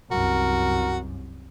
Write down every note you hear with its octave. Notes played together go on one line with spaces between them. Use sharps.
C2 F#2 F#4 A#4